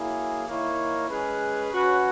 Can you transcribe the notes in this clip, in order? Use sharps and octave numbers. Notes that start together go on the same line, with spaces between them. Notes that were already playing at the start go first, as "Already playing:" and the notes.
Already playing: F#3 A#3 E4 G#4
D#3 A#3 E4 A#4 C#5
G#3 C#4 G#4 B4
F#3 C#4 F#4 B4